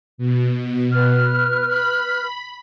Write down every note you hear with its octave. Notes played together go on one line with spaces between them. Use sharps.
B2
B4 F6
B5